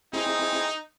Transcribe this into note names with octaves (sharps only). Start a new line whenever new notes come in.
C4 D#4 E4 G#4